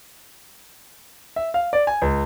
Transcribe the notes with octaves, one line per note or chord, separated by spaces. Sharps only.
E5
F5
D5
G#5
C#2